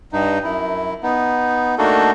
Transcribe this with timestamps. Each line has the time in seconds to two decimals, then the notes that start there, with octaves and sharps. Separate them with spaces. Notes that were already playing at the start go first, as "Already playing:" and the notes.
0.13 G2 D#4
0.44 F#2 E4
1.03 B3 D#4
1.78 A3 A#3 D4 D#4 F#4 A4